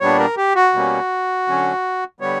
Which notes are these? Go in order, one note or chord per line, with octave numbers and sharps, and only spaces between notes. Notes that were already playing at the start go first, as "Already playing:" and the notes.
A#2 G3 B3 D4 C#5
A#4
G4
F#4
B2 G3 A#3 C#4
D3 F#3 C#4
D3 G3 B3 C#5